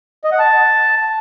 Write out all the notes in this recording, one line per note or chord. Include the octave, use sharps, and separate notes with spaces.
D#5
F#5
A5